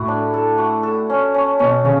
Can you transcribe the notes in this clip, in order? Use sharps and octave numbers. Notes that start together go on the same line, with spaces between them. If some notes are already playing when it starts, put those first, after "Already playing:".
Already playing: A2 F#4
D4
A4
F#4
A4
C#4
C#4
B2 C#4
C#3 C#4